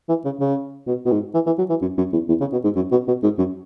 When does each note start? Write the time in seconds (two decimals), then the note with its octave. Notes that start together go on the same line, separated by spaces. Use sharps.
0.09 E3
0.25 C#3
0.40 C#3
0.87 B2
1.05 B2
1.12 G#2
1.34 E3
1.46 E3
1.58 F#3
1.70 E3
1.82 F#2
1.97 F#2
2.13 E2
2.29 E2
2.40 C#3
2.52 B2
2.64 G#2
2.76 F#2
2.91 B2
3.08 B2
3.23 G#2
3.38 F#2